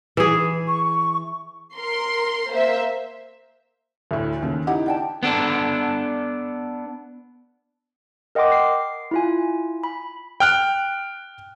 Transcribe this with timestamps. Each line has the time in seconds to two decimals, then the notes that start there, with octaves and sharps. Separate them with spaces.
0.17 E3 G#4
0.67 C#6
1.76 A#4 C6
2.51 A#3 C5 E5
4.11 D2 A2
4.42 D#2 C#3
4.67 D#4 E4 G4 F#5
4.86 D4 G5 A5
5.23 B3 D4 A4
8.35 A#4 D#5 F#5 G5 C6 D6
8.52 C7
9.11 E4 F4 G#5
9.84 B5
10.40 G5 F6 F#6